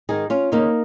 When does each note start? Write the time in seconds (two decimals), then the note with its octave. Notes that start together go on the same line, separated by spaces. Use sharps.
0.09 G#2 D#3 D#4 G#4
0.30 C#4 F4
0.52 D#2 C#3 A#3 D#4